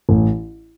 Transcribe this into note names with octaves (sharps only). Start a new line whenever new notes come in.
A1